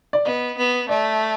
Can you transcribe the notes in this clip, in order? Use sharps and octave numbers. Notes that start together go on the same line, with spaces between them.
D5
B3 D#5
B3
A3 D5